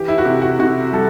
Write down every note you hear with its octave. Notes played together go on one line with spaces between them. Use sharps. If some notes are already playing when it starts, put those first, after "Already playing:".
Already playing: E3 G4
E4
F#4
C3 G4
F#4
C3 F#4
G3 A4